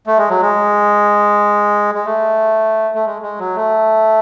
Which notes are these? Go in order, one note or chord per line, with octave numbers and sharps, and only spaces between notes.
A3
G#3
F#3
G#3
G#3
A3
A3
G#3
G#3
F#3
A3